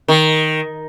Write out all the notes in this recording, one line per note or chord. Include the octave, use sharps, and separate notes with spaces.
D#3